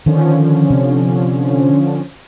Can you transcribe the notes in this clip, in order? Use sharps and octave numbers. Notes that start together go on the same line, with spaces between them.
D3 D#3 F3 C#4
C3